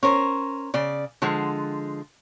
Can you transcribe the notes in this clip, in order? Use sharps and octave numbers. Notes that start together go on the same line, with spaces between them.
C#4 A#4 C5
C#3 D5
D3 F3 G#3